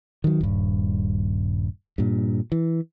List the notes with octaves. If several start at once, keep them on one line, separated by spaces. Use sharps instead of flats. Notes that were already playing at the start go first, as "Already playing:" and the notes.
D#3 F#3
D#1 G2
G2 A#2
E3